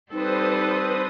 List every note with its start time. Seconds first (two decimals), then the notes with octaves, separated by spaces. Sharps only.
0.12 G3 C4 D#4 A4 B4 C5 D#6